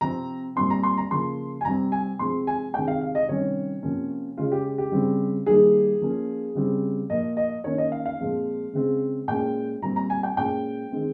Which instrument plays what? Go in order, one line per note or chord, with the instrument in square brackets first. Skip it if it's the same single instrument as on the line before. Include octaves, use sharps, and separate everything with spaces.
[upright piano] C3 F3 C4 A#5
A#2 G3 C4 C6
A#5
C6
A#5
C#3 F3 A#3 C6
G#5
C3 G3 C4 A#5
G#5
C3 F3 G#3 C4 C6
G#5
C3 D#3 G#3 C4 G5
F5
F5
D#5
C3 D#3 G3 C#4 C#5
C3 F3 A#3 C#4
C#3 G#3 C#4 F4
G4
G4
C#3 G3 C4
D#3 G3 A#3 G#4
F3 A#3 C#4
C#3 G3 C4
A#2 F3 A#3 D#5
D#5
D#3 A#3 C#4 C#5
D#5
F5
F5
A#2 F3 G#3 C4
C#3 G#3 C4
A#2 G#3 C#4 G5
A#2 G3 C4 A#5
A#5
G#5
G5
A#2 G#3 C#4 G5
D#3 G#3 C4